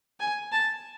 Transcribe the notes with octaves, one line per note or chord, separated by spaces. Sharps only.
G#5
A5